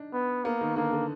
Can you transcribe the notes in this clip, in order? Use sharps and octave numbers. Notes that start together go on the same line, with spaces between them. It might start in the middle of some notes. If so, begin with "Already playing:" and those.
Already playing: D4 D#4
B3
A#3 B3
D#3
D3 A#3
D3